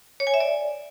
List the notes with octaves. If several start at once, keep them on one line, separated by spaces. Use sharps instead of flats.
C#5
G#5
E5
D5